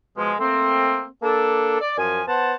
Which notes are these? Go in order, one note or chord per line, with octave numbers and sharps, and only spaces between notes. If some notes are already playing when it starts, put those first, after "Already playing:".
B2 F3 G#3
A3 A#3 C4
A#3 D4 A4
D5
F#2 F3 G#5
B3 C5 F#5 A5